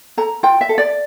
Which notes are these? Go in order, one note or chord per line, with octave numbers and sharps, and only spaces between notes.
A4 A#5
F4 G5
E5
A4
D5